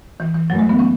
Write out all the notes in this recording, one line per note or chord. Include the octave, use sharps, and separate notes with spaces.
E3
E3
F#2 E3 F#3 A3
G#3
B3
C#4